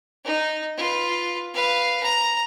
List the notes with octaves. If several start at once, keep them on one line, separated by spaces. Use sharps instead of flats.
D#4
F4 B4
B4 F5
A#5